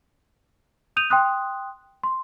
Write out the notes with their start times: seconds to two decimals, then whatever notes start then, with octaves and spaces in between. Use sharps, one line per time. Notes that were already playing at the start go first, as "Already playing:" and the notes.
0.96 D#6 G6 D#7 F7
1.10 G5 C6 D#6 F#6
2.03 C6